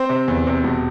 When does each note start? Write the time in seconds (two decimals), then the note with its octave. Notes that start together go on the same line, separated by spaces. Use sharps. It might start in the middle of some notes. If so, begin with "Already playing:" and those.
Already playing: C4 C5
0.09 C3
0.28 E2
0.47 C3
0.64 E1